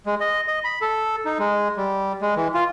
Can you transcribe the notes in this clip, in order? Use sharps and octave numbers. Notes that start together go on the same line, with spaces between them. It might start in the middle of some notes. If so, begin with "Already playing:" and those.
G#3
D#5
D#5
B5
A4
D#4
G#3
G3
G#3
E3
F4